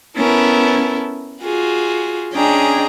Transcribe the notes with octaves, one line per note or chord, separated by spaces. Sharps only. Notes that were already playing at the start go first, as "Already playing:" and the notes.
B3 C#4 E4 A4 A#4
F4 F#4 G#4
C#4 D4 G#4 D#5 G5 A#5